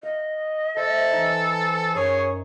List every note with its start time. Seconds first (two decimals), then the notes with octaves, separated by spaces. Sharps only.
0.03 D#5 F5
0.77 A4 C5 E5
1.12 E3 D#4
1.95 F#2 G#4 C#5